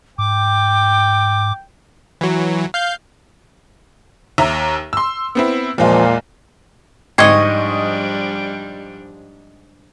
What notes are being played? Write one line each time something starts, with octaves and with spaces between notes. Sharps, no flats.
G#2 G5 D6
E3 F#3
F5 G6
D#2 E5 A#5
C6 E6
B3 C4 E4
E2 A#2 F3 G#3 F4
G#2 F3 G3 D4 D#5 G5 C#6 G#6